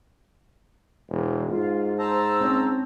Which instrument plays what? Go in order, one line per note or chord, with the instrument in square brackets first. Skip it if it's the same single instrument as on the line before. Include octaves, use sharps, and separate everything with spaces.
[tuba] E1
[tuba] G#2 [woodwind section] F4
[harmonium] C5 A5 A#5 [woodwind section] E6
[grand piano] C4 C#4